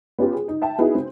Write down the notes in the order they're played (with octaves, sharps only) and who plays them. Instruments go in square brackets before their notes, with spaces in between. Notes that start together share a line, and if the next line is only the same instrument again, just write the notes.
[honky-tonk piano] B3 C#4 F4 G4
G#4
D#4
E5 G5 A5
B3 D#4 E4 F#4 G#4
C4